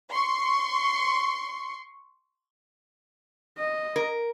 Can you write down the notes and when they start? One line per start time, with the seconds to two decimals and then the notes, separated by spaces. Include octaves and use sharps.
0.12 C6 C#6
3.58 D#5
3.96 A#4